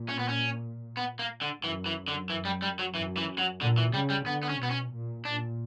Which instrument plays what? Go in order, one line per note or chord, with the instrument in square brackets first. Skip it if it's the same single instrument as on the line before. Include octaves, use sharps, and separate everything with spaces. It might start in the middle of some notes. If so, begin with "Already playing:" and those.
Already playing: [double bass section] A#2
[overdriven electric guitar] C#4
B3
C#4
B3
A#3
D3
[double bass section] F#2 [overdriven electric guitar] E3
[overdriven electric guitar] E3
D3
[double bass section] F#2 [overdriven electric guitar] E3
[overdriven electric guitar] G3
G3
F#3
[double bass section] F#2 [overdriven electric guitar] E3
[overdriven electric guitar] E3
F#3
[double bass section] A#2 [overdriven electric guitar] D3
[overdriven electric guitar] E3
[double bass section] C#3 [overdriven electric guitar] G3
[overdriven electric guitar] G3
[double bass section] D3 [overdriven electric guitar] B3
[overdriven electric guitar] B3
C#4
[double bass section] B2 [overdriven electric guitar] B3
[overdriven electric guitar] C#4
[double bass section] A#2
[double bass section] A#2 [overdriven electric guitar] D4